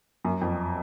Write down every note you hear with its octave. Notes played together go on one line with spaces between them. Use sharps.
F#2
F2